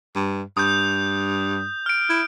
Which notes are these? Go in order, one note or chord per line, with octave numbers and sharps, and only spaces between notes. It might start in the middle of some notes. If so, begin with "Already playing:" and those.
G2
G2 D#6 G6
F6 D7
E4